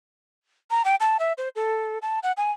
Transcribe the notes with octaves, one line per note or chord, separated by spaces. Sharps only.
A#5
G5
A5
E5
C5
A4
A5
F#5
G#5